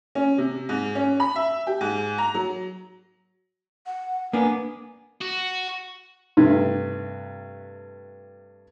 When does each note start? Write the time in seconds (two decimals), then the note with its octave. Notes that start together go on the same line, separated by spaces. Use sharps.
0.15 C#4
0.38 C3
0.69 G#2
0.95 C#4
1.20 B5
1.36 E5
1.67 G4
1.81 G#2
2.18 A#5
2.34 F#3
3.86 F#5
4.33 A#3 B3 D4 G#5
5.21 F#4
6.37 G2 C3 A3